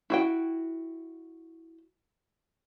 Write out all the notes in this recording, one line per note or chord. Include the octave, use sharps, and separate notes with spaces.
E4 F#4 G5